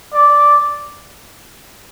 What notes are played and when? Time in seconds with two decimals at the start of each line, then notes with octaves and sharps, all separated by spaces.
0.14 D5